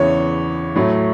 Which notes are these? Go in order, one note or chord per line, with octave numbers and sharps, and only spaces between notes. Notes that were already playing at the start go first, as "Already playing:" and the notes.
Already playing: E2 C#3 E3 C#5
A2 F#3 A3